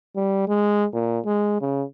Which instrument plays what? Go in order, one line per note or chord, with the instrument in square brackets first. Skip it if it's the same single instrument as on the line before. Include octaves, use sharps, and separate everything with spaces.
[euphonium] G3
G#3
A#2
G#3
C#3